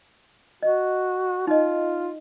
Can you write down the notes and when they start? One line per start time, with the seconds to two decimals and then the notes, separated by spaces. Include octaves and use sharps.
0.63 F#4 D#5
1.47 D#4 F4 D#5